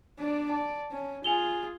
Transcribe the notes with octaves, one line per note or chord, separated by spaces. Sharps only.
D4 D5
D5 A5
C#4
F4 G#4 G#5 F7 G7